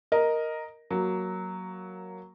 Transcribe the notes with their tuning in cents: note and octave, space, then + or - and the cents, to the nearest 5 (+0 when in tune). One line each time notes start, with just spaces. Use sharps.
A#4 +0 D#5 +0
F#3 +0 A#3 +0